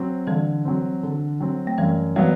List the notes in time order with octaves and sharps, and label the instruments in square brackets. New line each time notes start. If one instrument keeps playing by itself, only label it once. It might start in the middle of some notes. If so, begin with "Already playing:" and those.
Already playing: [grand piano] F#3 C4
[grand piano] D3 [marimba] E3 G3
[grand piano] F#3 C4
D3
F#3 C4
[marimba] A3
[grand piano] F#2 [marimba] E3 G3
[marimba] E3 G3 [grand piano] F#3 B3 F#4